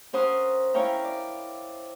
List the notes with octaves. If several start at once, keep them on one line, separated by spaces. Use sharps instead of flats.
C#4 A#4 C5 F#5 C6 D#6
C#4 E4 C#5 F5 G5 A#5
D5